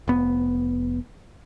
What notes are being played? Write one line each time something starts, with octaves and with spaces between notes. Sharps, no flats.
F1 B3